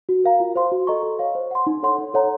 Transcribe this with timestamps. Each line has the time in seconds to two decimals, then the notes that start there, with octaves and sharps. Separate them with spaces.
0.09 F#4
0.24 A#4 F5 A#5
0.40 F4
0.56 C5 F5 C6
0.72 F#4
0.87 A4 D#5 A#5 C#6
1.03 A4
1.19 C#5 F5
1.35 C5
1.51 F#5 C6
1.67 D#4
1.83 A4 C#5 F#5 C6
1.98 D#4
2.14 A4 C#5 F#5 A#5